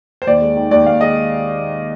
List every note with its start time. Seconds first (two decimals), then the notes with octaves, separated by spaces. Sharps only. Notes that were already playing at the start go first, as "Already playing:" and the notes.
0.22 C5
0.27 D#2 D5
0.42 G#3
0.56 D#3
0.71 D#2 D5
0.86 D#2 F5
1.00 G#3 D#5